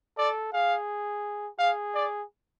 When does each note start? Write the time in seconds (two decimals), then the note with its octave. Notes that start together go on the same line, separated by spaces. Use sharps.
0.17 A4 D5
0.53 G#4 F5
1.59 G#4 F5
1.94 D5